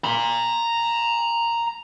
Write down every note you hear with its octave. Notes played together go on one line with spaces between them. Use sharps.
A#5 C6